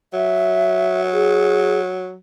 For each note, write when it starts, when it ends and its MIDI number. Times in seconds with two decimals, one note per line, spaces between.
0.14 2.16 54
0.14 1.01 76
1.13 1.80 68